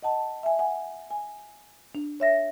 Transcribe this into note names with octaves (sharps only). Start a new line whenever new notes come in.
D#5 F#5 A5
E5 G#5
F#5 G#5
G#5
D4
C#5 E5 A#6